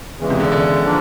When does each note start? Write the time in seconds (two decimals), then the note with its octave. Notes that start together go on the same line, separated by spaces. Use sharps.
0.19 E2 C#3 E3 G#3
0.30 C3
0.40 D3
0.52 D3
0.84 F3 A#3 D4